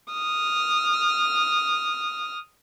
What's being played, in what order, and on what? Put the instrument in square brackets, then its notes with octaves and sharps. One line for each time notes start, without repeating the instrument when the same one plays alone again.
[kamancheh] D#6 F6